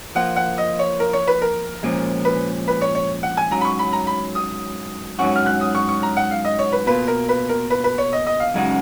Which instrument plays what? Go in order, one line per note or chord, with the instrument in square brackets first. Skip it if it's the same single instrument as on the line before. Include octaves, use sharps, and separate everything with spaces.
[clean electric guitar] F3 A#3 F4 [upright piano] F#5
[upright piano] F#5
D#5
C#5
A#4
C#5
B4
A#4
[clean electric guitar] A#2 F3 G#3 C#4
[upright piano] B4
B4
C#5
C#5
F#5
G#5
[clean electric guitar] G#2 F#3 C#4 [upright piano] A#5
[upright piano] B5
C#6
B5
A#5
B5
D#6
[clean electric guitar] G#2 F#3 C#4 F#4 [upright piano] C#6
[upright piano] F6
F#6
D#6
C#6
C#6
A#5
F#5
F5
D#5
C#5
B4
[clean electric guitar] B2 A#3 F4 [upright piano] B4
[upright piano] A#4
B4
A#4
B4
B4
C#5
D#5
D#5
F5
[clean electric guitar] F#2 C#3 G#3 D#4 F#4